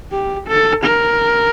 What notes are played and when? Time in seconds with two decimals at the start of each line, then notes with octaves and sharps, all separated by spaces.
0.12 G4
0.48 A4
0.85 A#4